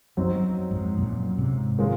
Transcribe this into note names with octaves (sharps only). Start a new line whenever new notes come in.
F#2 F#3 C4 D#4
F2 G#2
F#2 A#2
G#2 C3
D#3 G#3 C#4 F4